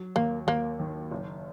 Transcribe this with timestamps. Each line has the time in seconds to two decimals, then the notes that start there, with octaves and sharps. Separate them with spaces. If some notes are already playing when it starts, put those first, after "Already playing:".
Already playing: F#3
0.16 D#2 A#3
0.47 D#2 A#3
0.80 D#3
1.12 F#1